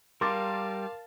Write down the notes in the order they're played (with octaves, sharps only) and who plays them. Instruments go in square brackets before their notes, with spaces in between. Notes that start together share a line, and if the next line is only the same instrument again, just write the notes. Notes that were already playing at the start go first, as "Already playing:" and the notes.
[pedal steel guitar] G3 [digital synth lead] A#4 [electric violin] F5 A5 [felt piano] C6 D6 A6